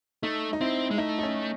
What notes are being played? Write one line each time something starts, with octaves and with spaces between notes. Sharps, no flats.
A3 D#4
D#4
C4 E4
G#3
A3 D#4
D#4
C#4